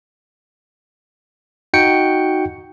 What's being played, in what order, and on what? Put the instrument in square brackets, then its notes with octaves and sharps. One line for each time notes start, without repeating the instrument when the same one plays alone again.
[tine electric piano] D#4 F#4 G5 C#7